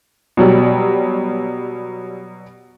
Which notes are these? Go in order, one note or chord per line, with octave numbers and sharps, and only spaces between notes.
B2 F#3 G3